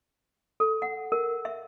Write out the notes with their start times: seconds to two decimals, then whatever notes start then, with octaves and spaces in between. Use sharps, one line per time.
0.60 A4
0.82 F#5
1.12 A#4
1.45 E5